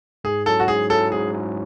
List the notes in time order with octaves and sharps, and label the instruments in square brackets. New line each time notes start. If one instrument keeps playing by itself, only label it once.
[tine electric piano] G#2 [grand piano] G#4
[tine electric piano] F#3 C#4 E4 [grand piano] A4
[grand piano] F#4
[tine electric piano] G#2 [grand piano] G#4
[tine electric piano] F#3 C#4 E4 [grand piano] A4
[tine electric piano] G#2 [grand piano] G#4
[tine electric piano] F#3 C#4 E4